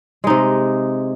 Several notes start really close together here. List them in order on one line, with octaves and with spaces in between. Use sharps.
G#3 D#4 C3